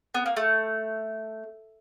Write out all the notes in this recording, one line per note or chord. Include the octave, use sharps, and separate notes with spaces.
B3
A#3
A3